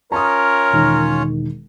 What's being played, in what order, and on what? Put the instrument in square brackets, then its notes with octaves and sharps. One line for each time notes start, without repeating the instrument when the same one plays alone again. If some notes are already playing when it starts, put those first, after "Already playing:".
[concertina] C#4 F4 C#5 [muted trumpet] A#4 [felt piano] A#5 D#6
[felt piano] E1 D#3